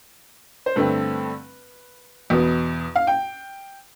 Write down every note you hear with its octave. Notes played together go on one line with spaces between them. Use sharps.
C5
G2 D3 A3 C4 B4
E2 B2 B3
F5
G5